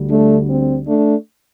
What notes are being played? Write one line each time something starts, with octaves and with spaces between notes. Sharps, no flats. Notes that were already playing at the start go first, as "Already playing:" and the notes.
Already playing: D2 D3 G3
A3 D4
C4
A3 D4